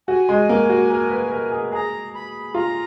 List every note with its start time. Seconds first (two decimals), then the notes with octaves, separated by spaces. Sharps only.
0.08 F#4 G#5
0.29 G#3
0.49 A#3
0.69 F#4
0.90 A#4
1.10 B4
1.31 A#4
1.52 G#4
1.72 G#4 A#5
2.14 B5
2.54 F4 A#5